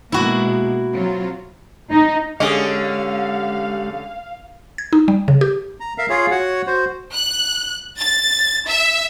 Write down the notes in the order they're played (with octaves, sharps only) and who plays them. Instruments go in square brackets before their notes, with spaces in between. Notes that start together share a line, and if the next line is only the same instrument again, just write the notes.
[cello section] B2 G#3 A#3 [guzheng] E4 F#4
[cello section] F#3 C4 F4
D#4
[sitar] D3 C#4 [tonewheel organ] G#3 G4 F#5 [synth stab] G#4 D#5 [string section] F5
[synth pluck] G#6
D#4
G3
C#3
G4
[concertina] A#5
A#4 E5 F5
F4 G#4 C#5 F5
F#4 C#5 F#5
F#4 C5
[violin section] F#6
A6
E5